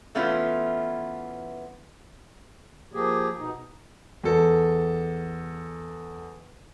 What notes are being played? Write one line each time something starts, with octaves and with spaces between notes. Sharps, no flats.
E3 A3 B3 C#4 E4 F4
F3 A#3 G4 G#4
B2 D#4
E2 A4